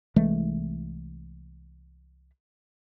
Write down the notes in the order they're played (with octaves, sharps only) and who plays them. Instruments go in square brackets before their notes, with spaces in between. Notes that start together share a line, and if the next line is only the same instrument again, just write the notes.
[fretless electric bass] C2 E3 G#3 A3